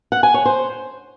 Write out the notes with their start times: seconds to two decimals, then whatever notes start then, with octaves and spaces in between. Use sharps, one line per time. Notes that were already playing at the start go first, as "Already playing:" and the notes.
0.12 F#5
0.23 G#5
0.34 C#5
0.45 C5